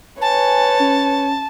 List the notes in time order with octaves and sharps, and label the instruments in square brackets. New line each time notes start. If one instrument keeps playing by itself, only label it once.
[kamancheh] B4 C#5 [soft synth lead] G#5 [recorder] A5
[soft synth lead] C#4